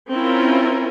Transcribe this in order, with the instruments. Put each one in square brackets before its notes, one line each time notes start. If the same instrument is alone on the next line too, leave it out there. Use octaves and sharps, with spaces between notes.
[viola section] C4 C#4 E4 F4 A#4